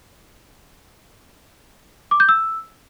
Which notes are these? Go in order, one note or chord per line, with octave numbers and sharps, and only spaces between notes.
D6
G6
E6